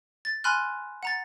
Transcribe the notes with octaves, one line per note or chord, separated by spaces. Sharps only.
A6
G#5 B5 C6 F6 F#6
F#5 A#5 A6